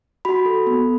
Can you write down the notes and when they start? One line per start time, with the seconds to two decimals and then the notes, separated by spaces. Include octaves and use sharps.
0.25 F#4 B5
0.46 A4
0.67 B3